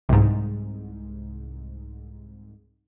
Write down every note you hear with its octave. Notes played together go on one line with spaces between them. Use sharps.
C2 G#2